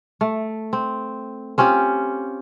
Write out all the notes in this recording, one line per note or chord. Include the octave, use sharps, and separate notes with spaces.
A3
C4
C4 C#4 F4 G4